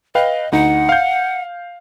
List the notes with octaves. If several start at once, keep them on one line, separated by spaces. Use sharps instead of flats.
B4 D#5 F5 G5
D2 D#4 F#5
F5 G6